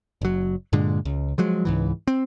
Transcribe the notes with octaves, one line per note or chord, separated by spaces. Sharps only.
F#1 F#3
G2 A#2 D3 G#3
C#2
F3 F#3 G#3
C#2 G#2 E3
C4